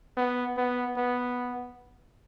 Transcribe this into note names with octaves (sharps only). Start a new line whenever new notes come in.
B3
B3
B3